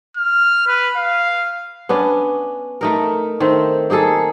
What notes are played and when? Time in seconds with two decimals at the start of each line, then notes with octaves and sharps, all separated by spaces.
0.17 F6
0.67 B4
0.96 F5
1.89 B3 C#4 D4
2.81 A3 D#4 A#4
3.40 D#3 A3 C4
3.90 A#3 D#4 G#4 A4